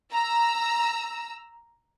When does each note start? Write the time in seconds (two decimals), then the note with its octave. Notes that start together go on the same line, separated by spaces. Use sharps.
0.12 A#5 E6